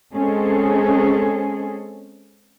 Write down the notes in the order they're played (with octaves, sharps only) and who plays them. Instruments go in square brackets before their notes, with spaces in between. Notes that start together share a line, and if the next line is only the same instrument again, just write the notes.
[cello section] G#3 C4 C#4 G#4 A4